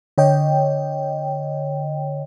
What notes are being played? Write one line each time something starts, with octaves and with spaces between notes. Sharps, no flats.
D3 C#5 D#5 G5